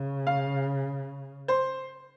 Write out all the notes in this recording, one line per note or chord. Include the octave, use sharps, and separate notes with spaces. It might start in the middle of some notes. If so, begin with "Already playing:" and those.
Already playing: C#3
F5
C5